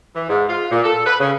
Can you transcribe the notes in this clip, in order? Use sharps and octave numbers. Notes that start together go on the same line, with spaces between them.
E3
G#2
F4
A#2
A4
B4
C#3